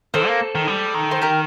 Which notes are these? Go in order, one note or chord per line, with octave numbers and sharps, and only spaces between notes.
D#3 A4 C5
A#3
D#3
G3
D#3
C5
G4 A#4